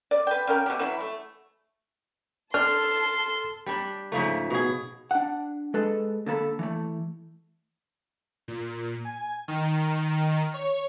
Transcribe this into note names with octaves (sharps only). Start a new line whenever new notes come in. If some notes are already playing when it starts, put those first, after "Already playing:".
D5
B4 G5
C#3 A#4 G5
B2 G4
E3 F#3 E4
A3
D4 A4 A5 C6 F6
G3 D4
G#2 C#3 F3 A3
B2 G#4
D4 F#5
G#3 G#4 A4 B4
D3 A#3 A4 B5
E3 A3
A#2
G#5
D#3
C#5